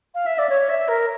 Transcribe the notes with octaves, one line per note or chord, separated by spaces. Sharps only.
F5
E5
D5
C#5
E5
A#4